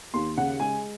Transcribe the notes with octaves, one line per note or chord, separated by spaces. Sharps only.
D#2 C6
C#3 F#5
G#3 G#5